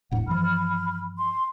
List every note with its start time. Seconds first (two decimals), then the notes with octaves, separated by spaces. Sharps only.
0.11 E1 A2 D4 F#5
0.27 G2 E3 F3 B5 F6
1.17 C6